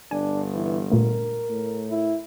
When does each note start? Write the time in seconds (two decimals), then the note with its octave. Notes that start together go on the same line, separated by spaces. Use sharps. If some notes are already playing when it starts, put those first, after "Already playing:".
0.11 G1 D4 G#5
0.54 E3
0.92 A#2 A3 A#4
1.50 A2
1.90 E4